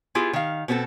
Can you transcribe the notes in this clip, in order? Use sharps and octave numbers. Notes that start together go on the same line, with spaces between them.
B3 E4 F4 G4 G#4
D#3 F5
B2 B3 C4 G#4 A4